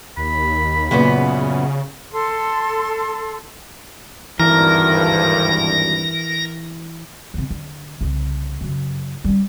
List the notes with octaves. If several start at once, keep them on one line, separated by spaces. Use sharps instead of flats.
D#2 B5
F#2 A#2 C#3 B3
A4 C6
G#1 D2 G2 E3 A#4 A#6
E2 C3
D3
C2 C#3
F#2 C#3
G3 C#4